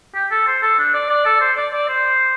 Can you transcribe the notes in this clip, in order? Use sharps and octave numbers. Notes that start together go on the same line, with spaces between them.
G4
A4
C5
A4
D4
D5
D5
A4
C5
D5
D5
C5